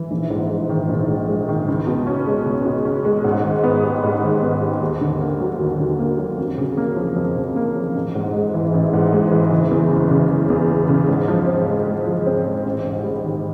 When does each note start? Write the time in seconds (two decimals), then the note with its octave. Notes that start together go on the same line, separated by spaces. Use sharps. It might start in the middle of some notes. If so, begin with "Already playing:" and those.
Already playing: E3
0.11 A#1
0.30 G#2
0.50 G#3
0.69 D#3
0.89 A#1
1.08 G#2
1.28 G#3
1.48 D#3
1.68 C#2
1.87 B2
2.07 C#4
2.27 G#3
2.46 C#2
2.65 B2
2.85 C#4
3.05 G#3
3.24 G#2
3.44 D#3
3.63 B3
3.83 G3
4.03 G#2
4.23 D#3
4.42 B3
4.61 G3
4.81 D#2
5.01 D3
5.20 A#3
5.41 F#3
5.59 D#2
5.80 D3
5.99 A#3
6.18 F#3
6.38 F2
6.58 C#3
6.77 A#3
6.97 F3
7.16 F2
7.36 C#3
7.56 A#3
7.76 F3
7.95 A1
8.15 G#2
8.34 G#3
8.54 E3
8.74 A1
8.93 G#2
9.13 G#3
9.32 E3
9.51 F#1
9.71 E2
9.91 F#1
10.11 C#3
10.30 F#1
10.50 E2
10.69 F#1
10.89 C#3
11.08 G#2
11.28 F3
11.47 C4
11.67 G#3
11.87 G#2
12.07 F3
12.26 C4
12.45 G#3
12.65 A1
12.85 G#2
13.04 G3
13.24 D#3